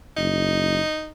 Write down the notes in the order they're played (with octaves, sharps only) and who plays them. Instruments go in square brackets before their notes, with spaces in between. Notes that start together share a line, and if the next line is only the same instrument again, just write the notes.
[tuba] F#1 [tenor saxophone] D#4